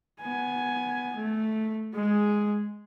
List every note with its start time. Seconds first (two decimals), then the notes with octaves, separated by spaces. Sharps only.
0.21 B3 G#5
1.16 A3
1.94 G#3 G#4